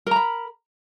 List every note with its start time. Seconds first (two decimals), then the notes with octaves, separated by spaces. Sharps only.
0.07 A#4
0.11 A#5
0.16 B5